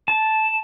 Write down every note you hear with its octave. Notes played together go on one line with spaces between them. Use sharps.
A5